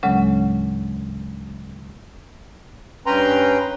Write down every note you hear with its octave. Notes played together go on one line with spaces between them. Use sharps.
D2 A2 C#3 F#3 G#3 C#4
G2 C#4 B4 G5 A#5 C6